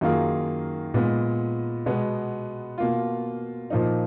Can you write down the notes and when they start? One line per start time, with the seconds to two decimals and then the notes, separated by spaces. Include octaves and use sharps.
0.01 F#2 D#3 A#3 F4 G#4
0.94 A#2 G#3 B3
1.86 B2 G#3 B3
2.78 B2 A#3 F4
3.70 A#2 F3 A#3 D#4